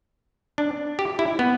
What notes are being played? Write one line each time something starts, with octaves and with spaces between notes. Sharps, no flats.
D4
G4
E4
B3